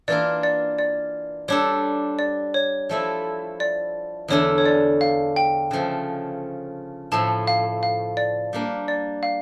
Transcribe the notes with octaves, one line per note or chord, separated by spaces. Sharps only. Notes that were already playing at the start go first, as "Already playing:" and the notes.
E3 A#3 D4 F4 A#4 D5
D5
D5
G3 D4 A4 C#5
D5
C#5
F3 A3 E4
D5
E2 D3 A3 D4 C#5
C#5
D5
F5
G5
C#3 F3 A3
A2 F3 A3 A5
F5
F5
D5
G3 A#3 D4
D5
F5